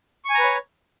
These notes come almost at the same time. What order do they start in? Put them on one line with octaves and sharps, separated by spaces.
C#6 G#5 A#5 B4 C#5